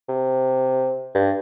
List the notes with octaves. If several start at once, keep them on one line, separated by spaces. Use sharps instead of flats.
C3
G2